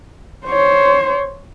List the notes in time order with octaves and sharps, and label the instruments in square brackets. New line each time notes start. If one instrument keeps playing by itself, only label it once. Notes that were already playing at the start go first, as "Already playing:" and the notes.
[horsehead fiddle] C5 C#5